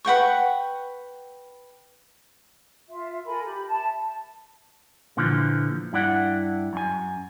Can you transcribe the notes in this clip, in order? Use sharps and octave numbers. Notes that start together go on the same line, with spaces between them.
B4 F#5 G5 C#6
F4 E5
A4 A#4 G#5 B5
G4 B5
E5 A5
A#2 D3 E3 F3
G2 E4 D5 F#5
F#2 G#5